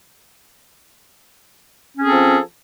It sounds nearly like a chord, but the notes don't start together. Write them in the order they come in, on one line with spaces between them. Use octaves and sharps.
C#4 C4 G#4 A4 F3